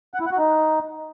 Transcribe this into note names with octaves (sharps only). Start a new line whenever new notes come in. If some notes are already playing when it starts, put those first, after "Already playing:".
F#5
E4
F#5
F#4
D#4